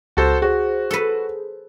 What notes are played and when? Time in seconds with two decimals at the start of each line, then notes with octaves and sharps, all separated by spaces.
0.17 C#2 F#4 A4 C5
0.42 F#4 G#4 C5
0.91 A4 B4